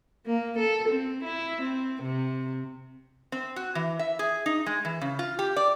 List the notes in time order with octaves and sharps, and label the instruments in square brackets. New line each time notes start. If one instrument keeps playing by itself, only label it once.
[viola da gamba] A#3
A4
C4
E4
C4
C3
[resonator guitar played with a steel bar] C4
F#4
E3
E5
G#4
D#4
G#3
E3
C#3
F4
G4
D5